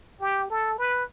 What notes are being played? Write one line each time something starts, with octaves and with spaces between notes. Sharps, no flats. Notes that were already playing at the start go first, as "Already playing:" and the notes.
G4
A4
B4